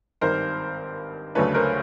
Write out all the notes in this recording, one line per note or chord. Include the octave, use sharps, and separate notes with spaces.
G#1 G2 D#3 A#4 C5
D2 C#3 F#3 A3 D4 B4 C#5
A#4 C5